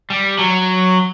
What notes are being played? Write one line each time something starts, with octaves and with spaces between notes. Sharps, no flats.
G3
F#3